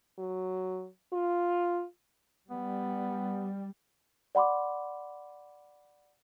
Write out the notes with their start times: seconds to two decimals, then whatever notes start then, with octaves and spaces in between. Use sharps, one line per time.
0.18 F#3
1.12 F4
2.50 G3 B3
4.35 D5 F#5 B5 C6 D6